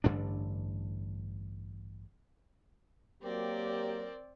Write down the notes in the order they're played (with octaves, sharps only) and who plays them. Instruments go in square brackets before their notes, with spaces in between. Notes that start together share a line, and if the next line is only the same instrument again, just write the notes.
[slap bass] A1 G2 D3 D4
[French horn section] F#3 A#3 [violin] C4 D5 [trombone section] G4 [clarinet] A#4